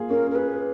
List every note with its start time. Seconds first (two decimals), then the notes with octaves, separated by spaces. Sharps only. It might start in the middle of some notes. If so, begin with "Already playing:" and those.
Already playing: A#3 F4 G#4
0.10 C#4 A#4
0.31 A#4
0.35 G#4 B4